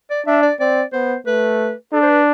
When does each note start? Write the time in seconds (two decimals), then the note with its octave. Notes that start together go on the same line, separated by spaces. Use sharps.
0.10 D5
0.26 D4 E5
0.43 D5
0.60 C4 D5
0.93 B3 C5
1.27 A3 B4
1.93 D4 A4
2.02 C5
2.09 B4